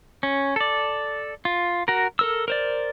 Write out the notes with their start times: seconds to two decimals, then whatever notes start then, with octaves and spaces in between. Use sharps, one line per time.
0.23 C#4
0.56 A4 D5
1.45 F4
1.88 F#4 A#4
2.19 A4 A#4 E6
2.48 A#4 C5 D5